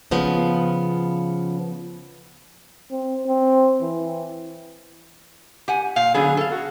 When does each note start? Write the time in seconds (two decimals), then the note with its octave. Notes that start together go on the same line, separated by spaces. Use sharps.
0.11 C#3 F3 B3
2.91 C4
3.27 C4
3.81 E3
5.68 G4 F#5 G#5
5.96 A#2 F5
6.14 D3 F#3 B3 G#4
6.37 A4 F5
6.51 F#4